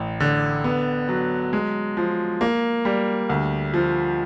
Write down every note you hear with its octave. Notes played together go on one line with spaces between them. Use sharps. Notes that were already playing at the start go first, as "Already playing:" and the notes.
Already playing: A1
D3
B3
F#3
G#3
F3
A#3
G3
D2
F3